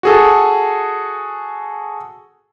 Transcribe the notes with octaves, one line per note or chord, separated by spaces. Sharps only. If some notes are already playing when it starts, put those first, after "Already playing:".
F#4 G#4 A4